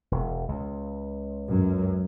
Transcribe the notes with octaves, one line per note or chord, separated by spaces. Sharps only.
E1
C#2
F#2